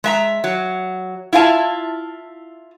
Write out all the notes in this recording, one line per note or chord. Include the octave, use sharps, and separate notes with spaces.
G#3 E5 A#5
F#3
E4 F4 F5 G#5 A5